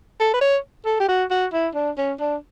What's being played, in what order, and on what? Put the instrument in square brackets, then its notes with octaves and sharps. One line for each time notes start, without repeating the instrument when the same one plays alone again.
[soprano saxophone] A4
B4
C#5
A4
G4
F#4
F#4
E4
D4
C#4
D4